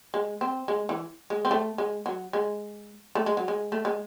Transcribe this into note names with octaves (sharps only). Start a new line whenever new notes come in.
G#3
C4
G#3
E3
G#3
C4
A3
G#3
F#3
G#3
A3
G#3
F#3
G#3
A3
G#3